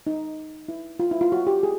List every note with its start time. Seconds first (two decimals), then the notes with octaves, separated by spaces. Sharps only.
0.07 D#4
0.69 E4
1.00 F4
1.11 E4
1.21 F4
1.32 F#4
1.47 G4
1.63 G#4